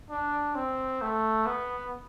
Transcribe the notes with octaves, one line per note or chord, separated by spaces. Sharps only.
D4
C4
A3
B3